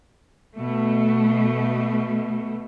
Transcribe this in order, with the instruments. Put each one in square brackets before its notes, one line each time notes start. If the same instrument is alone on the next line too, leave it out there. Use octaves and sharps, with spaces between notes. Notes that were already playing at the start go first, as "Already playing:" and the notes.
[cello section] B2 A3